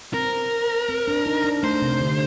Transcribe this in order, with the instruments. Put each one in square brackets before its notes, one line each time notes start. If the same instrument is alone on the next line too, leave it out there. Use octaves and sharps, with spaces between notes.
[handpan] C4 [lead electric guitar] A#4
[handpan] C4
D4
D#4
D4
[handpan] A3 [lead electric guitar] C5
[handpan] C3
D3